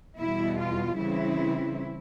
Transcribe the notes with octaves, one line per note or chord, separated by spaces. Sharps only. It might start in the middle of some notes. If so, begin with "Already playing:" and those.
E2 B2 G3 E4
F4
C#3 E3 G3 C4 E4